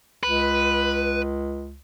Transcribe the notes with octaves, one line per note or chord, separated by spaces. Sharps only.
C#2 B4